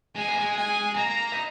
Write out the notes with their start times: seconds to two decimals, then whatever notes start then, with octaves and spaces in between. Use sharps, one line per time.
0.16 G#3 G#5
0.28 A#3
0.40 G#3
0.57 G#5
0.96 A#3 A#5
1.32 D#4